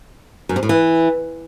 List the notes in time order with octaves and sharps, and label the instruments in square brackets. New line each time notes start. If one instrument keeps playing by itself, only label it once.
[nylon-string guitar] F#2
C3
A2
E3